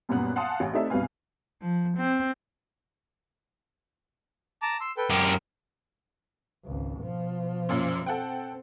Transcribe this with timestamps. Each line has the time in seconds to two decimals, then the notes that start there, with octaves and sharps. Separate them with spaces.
0.09 F#2 A#2 G3 B3 F#6
0.36 F5 F#5 G#5 A5 C6 D#6
0.60 A1 G#5
0.73 A3 C4 D#4 A4 D5 E5
0.90 C2 G2 B2 B4 F5 G#5
1.62 F3
1.97 C4
4.62 A5 A#5 D6
4.81 C6 E6
4.97 A4 B4 G5
5.10 F#2 G4 A#4
6.65 G#1 C#2
7.00 B2 F3
7.69 F#2 A#2
8.06 C4 A4 F#5 G5